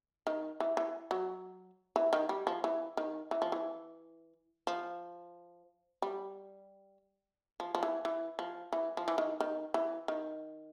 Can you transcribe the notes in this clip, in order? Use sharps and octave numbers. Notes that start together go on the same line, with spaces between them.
D#3
E3
E3
F#3
E3
D#3
G3
F3
E3
D#3
E3
F3
E3
F3
G3
F3
F3
E3
E3
F3
E3
F3
E3
D#3
D#3
E3
D#3